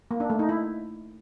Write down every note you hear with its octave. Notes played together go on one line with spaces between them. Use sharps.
A#3
D4
A3
D#4
E4